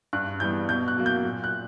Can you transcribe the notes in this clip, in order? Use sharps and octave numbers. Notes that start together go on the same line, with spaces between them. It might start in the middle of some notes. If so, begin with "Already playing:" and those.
G2 F#6
E3 G3 B3 G6
B2 G6
F#6
F#3 A#3
G6
A#2
F#6